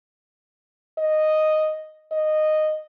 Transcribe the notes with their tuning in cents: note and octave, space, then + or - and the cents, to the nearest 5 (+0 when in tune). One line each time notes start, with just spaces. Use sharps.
D#5 -5
D#5 -10